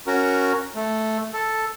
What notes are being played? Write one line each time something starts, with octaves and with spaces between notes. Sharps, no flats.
C#4 F#4 A#4
A3
A4